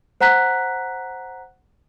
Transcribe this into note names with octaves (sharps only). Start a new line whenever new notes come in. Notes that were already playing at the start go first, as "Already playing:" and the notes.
C5 F#5 A#5 F#6 B6